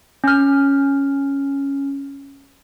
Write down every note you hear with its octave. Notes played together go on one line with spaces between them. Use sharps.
C#4 F6